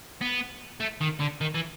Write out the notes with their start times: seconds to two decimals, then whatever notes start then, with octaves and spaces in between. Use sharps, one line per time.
0.21 B3
0.80 A3
1.01 D#3
1.20 D3
1.41 D#3
1.55 E3